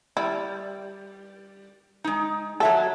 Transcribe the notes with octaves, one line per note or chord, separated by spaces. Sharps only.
G3 E4
G#3 D#4
F#3 A4 E5 A#5